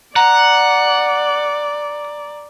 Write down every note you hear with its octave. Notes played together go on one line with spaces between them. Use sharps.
D5 F#5 A#5